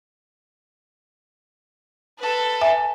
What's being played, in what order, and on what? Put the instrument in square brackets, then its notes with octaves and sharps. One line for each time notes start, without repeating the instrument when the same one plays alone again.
[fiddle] A4 B4
[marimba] E5 G#5